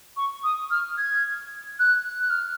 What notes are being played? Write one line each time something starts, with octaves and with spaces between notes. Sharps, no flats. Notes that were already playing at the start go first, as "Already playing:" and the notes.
C#6
D#6
F6
G#6
F#6
F#6
F6